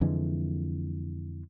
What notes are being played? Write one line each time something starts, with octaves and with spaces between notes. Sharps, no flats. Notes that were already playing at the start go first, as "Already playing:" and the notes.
F2 D3 E3 G#3